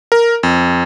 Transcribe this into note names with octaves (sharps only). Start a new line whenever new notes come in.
A#4
F2